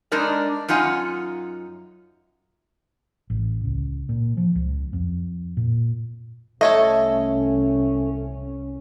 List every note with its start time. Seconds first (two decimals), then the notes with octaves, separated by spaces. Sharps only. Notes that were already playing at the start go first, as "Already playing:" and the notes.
0.12 G#3 D4 D#4 A#4 D5
0.68 F#2 D#4 F4 F#5 G#5
3.30 A1
3.65 C#2
4.09 A#2
4.37 F3
4.55 C#2
4.93 F2
5.57 A#2
6.61 C2 A3 C#4 A4 C#5 D#5 E5